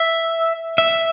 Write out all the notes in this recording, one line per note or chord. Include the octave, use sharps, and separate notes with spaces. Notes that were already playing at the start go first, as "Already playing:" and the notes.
Already playing: E5
E5